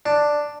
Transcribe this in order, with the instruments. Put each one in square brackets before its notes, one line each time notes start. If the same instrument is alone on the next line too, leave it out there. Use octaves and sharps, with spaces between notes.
[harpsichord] D4